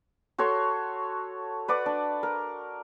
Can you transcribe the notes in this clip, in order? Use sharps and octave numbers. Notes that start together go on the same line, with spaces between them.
F#4 A4 C#5 C6
B4 D5 F#5 D6
D4
A#4